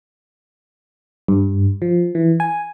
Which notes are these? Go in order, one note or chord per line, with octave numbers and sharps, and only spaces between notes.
G2
F3
E3
G#5